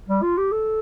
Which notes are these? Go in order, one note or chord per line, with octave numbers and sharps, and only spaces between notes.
G3
F4
G4
A4